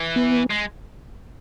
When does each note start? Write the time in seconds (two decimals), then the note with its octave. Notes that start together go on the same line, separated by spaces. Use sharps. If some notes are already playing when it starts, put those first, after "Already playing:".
Already playing: E3
0.16 B3
0.50 G#3